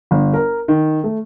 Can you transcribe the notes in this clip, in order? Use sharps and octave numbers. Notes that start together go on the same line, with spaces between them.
G1
A#4
D#3
A3